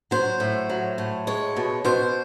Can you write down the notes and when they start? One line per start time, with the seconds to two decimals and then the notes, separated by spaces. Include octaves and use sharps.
0.11 F#3 C5
0.40 A2
0.69 F#3
0.98 A2
1.27 G#3 C#5
1.56 B2
1.85 B2 C5